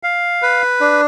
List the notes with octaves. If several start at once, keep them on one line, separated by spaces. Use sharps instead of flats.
F5
B4
D4